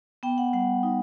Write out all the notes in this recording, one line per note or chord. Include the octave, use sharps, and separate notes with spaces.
B3 G5
F#5
G3 F#5
D#4